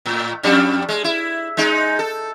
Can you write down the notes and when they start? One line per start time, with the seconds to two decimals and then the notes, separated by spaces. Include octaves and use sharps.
0.06 A2
0.43 F2 G3 D4
0.89 G#3
1.04 E4
1.57 G#3 D#4
1.99 A4